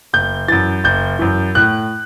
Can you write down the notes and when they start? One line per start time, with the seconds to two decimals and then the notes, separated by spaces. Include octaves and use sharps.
0.13 F#1 G6
0.48 F#2 E3 A6
0.84 F#1 G6
1.19 F#2 E3
1.55 A2 F#6